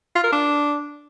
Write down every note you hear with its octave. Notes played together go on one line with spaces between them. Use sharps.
F4
A#4
D4